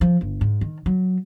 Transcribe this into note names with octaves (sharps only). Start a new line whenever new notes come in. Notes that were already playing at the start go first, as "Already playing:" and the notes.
F3
G1
G#2
D#3
F#3